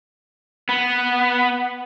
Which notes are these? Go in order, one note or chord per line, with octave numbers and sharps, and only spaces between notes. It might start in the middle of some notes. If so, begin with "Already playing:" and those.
B3